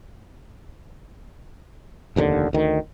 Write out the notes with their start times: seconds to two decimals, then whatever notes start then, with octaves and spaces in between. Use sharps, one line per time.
2.16 F1 D#2 A2 D3
2.53 D2 D#3